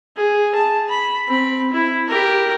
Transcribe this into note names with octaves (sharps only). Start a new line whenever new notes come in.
G#4
A5
B5
C4 B5
E4
G4 A#4